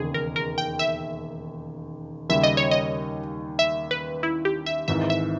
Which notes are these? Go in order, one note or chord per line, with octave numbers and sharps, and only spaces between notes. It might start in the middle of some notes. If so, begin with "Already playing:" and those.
Already playing: E1 D#2 C#3 G#4
A#4
A#4
G5
E5
D#2 C#3 G3 E5
D#5
C#5
D#5
E5
B4
E4
G4
E5
G#1 G#2 E3 E5
E5